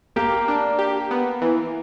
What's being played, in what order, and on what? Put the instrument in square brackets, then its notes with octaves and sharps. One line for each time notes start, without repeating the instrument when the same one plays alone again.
[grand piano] A#3 [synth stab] G4
[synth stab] D4
G4
B3
E3